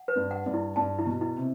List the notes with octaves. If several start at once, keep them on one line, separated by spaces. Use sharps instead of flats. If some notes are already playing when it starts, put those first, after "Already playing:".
Already playing: F#5
B4
G2
F#5
G2
E4
G2 A5
E4
B2
E4
C3